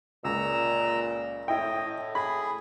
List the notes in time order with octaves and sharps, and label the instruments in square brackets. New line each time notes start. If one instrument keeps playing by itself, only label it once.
[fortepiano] C#2 [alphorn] A#2 [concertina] A#5 E6
[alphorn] A2 [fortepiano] E4 G5 [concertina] D#5
[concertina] G#4 [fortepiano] B5